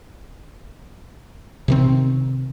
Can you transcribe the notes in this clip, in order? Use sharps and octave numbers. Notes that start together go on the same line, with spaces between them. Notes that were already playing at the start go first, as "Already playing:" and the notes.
C3 D#3 C4